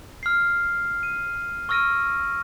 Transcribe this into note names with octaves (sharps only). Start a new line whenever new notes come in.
F6 C7
D#7
C#6 E6 F6 A#6 D7 D#7